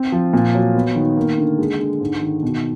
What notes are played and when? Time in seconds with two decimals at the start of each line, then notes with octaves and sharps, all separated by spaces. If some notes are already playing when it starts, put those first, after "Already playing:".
Already playing: C4
0.12 F3
0.33 A#2
0.54 F#3
0.75 B3
0.95 D#3
1.17 A#3
1.38 D3
1.58 G#3
1.79 D3
2.01 G#2
2.22 D#3
2.43 B2